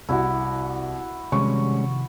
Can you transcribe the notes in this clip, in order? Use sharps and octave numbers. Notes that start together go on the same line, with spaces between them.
C2 E4 F#4
C3 D#3 F3 G3 G#3 C#4 C#6